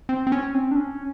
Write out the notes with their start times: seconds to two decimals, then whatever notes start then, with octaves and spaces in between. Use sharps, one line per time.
0.09 C4
0.27 C4
0.32 C#4
0.55 C4
0.71 D4
0.77 C#4